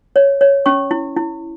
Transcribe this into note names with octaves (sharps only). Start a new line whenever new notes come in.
C#5
C#5
C#4 C#6
E4
E4